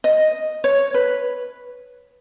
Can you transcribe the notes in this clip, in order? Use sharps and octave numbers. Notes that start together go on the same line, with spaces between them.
D#5
C#5
B4